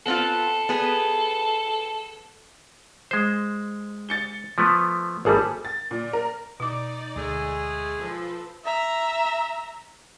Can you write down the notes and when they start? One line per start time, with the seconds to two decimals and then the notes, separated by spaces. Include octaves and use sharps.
0.06 B3 C4 F4 A4
0.69 B3 G#4 B4
3.11 G#3 C5
4.09 A6 C#7 G7
4.58 F3 A3 B3
5.25 G#1 G3 A#3 G#4 A4
5.65 A6
5.91 A#2
6.13 A#4
6.60 B2 D#4 D5 D6
7.16 D2 G#3 A3 G#4
7.98 F3 A4 B4
8.65 E5 A#5